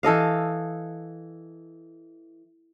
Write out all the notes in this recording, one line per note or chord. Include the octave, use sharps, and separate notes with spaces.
E3 A4 D#5 F5